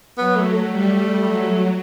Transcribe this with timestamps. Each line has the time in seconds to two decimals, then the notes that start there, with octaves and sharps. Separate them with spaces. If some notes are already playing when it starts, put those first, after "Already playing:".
0.18 F#3 B3
0.36 A3
0.54 A3
0.70 G3
1.23 F#3